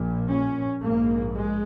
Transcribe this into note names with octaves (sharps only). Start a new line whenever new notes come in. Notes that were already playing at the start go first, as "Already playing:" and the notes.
Already playing: A#1 A#2
C#4
A#1 G#2 A#3
G#3